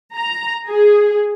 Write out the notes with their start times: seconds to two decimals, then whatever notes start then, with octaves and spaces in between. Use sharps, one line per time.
0.16 A#5
0.68 G#4